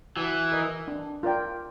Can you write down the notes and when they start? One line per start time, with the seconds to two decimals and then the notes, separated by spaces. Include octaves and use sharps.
0.16 E3 F#4
0.52 A#4 D#5
0.88 D4
1.23 F4 A#4 D5 G5